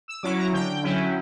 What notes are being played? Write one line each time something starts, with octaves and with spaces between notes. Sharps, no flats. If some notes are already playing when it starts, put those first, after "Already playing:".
E6
F#3 C#4 E4 D6
A#5
D3 G5
F#3 C#4 E4